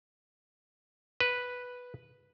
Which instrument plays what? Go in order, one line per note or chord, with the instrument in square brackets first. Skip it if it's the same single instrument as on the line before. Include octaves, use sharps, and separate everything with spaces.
[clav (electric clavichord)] B4